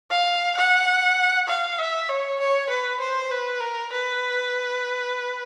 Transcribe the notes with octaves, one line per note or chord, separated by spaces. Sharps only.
F5
F#5
F5
E5
C#5
C#5
B4
C5
B4
A#4
B4